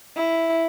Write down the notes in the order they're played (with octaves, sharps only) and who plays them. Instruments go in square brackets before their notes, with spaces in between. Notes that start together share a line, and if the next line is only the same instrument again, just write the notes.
[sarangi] E4